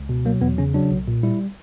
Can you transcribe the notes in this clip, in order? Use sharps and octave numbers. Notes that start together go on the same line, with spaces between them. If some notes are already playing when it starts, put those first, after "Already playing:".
Already playing: C#2
B2
F#3 A#3
E2 B3
C#3 C#4
F#3 D4
B1
A#2
G3 E4